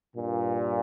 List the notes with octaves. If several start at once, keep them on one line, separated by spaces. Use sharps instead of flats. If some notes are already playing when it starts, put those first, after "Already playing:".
G2 A#2